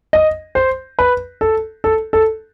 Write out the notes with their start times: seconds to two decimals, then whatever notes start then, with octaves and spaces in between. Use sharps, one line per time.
0.13 D#5
0.55 C5
0.99 B4
1.41 A4
1.84 A4
2.13 A4